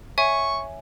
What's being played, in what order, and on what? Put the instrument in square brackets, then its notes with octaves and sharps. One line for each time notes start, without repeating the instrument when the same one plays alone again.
[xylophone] C#5 E5 G#5 [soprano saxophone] C#6